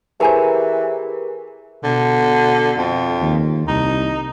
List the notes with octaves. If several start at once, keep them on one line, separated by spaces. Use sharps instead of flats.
E3 G4 G#4 A#4 C5 G#5 A#5
B2 D3
F2
D#2
C2 D#4